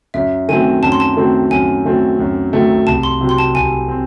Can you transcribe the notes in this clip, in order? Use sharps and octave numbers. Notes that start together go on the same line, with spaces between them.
F#2 E5
D#3 F#3 A3 C4 G#5
F#2 A5
C6
A5
D#3 F#3 A3 C4
F#2 G#5
D#3 F#3 A3 C4
F#2
D#3 F#3 A3 C4
C2 A5
C6
C3 F#3 C4
C6
A5
C2 G#5
C4